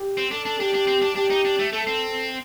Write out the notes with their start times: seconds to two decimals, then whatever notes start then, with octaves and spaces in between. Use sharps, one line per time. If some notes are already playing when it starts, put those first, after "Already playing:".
Already playing: G4
0.17 C4
0.31 D4 A4
0.45 D4
0.59 D4 G4
0.74 D4
0.87 C4
1.02 D4
1.16 D4 G4
1.30 D#4
1.45 D4
1.59 A3
1.73 A3 A4
1.87 C4